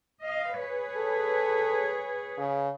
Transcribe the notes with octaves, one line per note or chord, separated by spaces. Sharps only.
D#5 F5
G#4 B4 C#5
A4
C#3